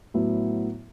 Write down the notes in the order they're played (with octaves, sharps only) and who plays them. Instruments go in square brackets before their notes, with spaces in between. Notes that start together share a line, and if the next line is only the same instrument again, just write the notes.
[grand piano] A2 F#3 B3 E4